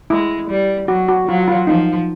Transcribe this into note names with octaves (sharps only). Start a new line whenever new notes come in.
G#3 E4
G3
F#3 F#4
F#4
F#3 F4
F4
F3 D#4